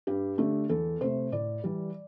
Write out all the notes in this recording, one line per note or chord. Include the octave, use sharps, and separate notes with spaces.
G2 G4
D3 A3
E2 A4
C3 A3 C5
A2 D5
E3 G3